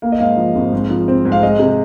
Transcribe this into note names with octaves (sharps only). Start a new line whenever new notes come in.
A#3 F5
D#5
G#2 F5
F3
G#1
G#2
F3
C4
G#2
F5
G#3 D#5
C3